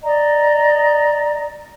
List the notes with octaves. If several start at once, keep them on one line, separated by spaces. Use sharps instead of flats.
D5 D#5 A#5